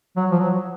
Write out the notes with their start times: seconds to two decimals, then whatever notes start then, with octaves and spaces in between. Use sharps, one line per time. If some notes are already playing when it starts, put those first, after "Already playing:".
0.16 F#3
0.31 F3
0.40 F#3